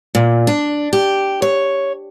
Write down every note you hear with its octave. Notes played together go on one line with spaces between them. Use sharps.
A#2
D4
G4
C#5